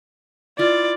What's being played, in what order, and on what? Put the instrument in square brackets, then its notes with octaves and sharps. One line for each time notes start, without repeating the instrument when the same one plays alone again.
[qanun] E4 F4 [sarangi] D5